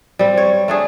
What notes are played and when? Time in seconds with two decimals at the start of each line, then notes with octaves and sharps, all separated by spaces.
0.19 G3 C4
0.38 C#5
0.68 A3 D4 G#4